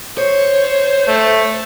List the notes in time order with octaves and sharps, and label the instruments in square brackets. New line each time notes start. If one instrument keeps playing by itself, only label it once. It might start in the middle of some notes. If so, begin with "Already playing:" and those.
[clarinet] C5 [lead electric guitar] C#5
[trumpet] A3